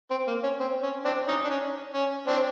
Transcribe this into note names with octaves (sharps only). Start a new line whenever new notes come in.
C4
A#3
C#4
C4
C#4
C4 D4
C#4 D#4
D4
C#4
C#4
C4 D4